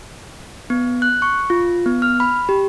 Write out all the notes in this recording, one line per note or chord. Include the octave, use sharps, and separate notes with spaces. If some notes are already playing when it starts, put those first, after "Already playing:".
B3
F#6
C#6
F4
B3
F6
B5
G4